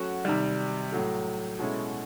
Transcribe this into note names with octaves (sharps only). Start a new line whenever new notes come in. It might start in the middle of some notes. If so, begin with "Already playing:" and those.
Already playing: F#3 A3 C#4 F#4
C3 D#3 G3
A2 F#3 A3
B2 G#3 C#4 E4 A4